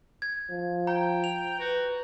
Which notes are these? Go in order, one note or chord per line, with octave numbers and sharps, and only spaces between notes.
G#6
F3
G5 A#5
F7
F#4 B4